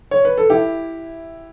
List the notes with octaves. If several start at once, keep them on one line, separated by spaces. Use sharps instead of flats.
C#5
B4
A4
E4 G4